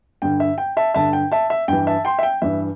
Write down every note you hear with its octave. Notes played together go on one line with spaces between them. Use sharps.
G2 D3 G5
E5
G5
E5 A5
G2 D3 E5 A5
G5
E5 A5
E5
G2 E3 G5
E5 A5
G5 C6
E5
G5
G2 E3 E5